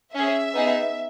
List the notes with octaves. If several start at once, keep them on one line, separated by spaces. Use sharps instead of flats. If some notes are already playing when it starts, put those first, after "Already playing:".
C#4 G#4 E5
B3 D#4 G#4